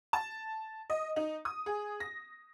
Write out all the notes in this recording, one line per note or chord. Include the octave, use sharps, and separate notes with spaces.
A5
D#5
D#4
D#6
G#4
A#6